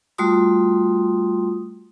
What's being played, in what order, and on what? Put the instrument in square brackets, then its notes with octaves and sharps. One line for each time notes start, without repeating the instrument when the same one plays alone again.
[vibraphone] G3 A3 F4 F#4 C6 D#6